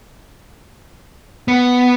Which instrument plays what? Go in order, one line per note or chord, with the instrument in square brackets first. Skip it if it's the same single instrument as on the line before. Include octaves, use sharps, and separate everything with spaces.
[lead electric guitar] B3